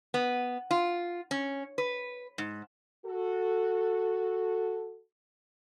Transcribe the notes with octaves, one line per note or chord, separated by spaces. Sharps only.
B3
F4
C#4
B4
G#2
F#4 A4